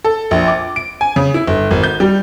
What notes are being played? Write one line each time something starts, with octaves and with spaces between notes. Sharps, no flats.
A4
A#1
D6
D7
G#5
C#3
E4
G1
G#1
G6
G3